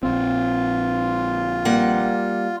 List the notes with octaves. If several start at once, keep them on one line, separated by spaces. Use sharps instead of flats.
A#1 C4 F4
G3 A#3 F#5